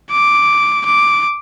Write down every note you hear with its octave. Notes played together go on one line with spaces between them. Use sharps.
D6
D6